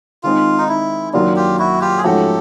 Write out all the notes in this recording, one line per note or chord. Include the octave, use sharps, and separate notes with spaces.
D#3 G#3 C4 D#4 F4
D#4
E4
F#2 D#3 F#3 A#3 D4 F4
F4 G4
E4 F#4
F4 G4
G#4
G#2 F3 A3 C#4 F#4 G4 A4